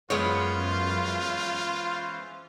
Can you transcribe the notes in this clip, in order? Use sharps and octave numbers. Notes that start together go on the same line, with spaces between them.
F#2 E3 G#3 B3 C#4 F4 C5 C#5